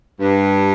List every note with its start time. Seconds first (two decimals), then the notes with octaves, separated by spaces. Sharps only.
0.20 G2